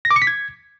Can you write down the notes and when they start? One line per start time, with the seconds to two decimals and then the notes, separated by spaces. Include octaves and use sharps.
0.05 A#6
0.11 D6
0.16 C#7
0.22 B6
0.27 G#6